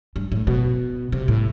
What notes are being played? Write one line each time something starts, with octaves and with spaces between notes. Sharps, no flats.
G2
A2
B2
C3
A2